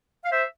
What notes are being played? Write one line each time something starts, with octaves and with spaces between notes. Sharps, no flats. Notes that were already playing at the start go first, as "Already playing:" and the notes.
F5
C5 E5